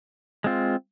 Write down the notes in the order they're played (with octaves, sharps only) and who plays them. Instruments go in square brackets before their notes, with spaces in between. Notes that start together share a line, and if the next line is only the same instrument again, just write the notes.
[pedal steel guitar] G#3 C4 F4